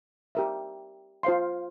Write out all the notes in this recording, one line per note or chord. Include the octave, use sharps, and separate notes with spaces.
G4 A#4 E5
F4 C5 F5 C6